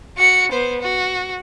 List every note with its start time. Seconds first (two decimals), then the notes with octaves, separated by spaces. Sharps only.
0.17 F#4 C#7
0.52 B3 C5
0.81 F#4